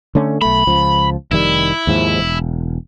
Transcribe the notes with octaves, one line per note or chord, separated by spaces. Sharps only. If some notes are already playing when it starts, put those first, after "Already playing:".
D3 A3 C#4
B1 A3 B5
C#2 F3
F1 D#3 G3 E4
D#2 G#2 F3
E1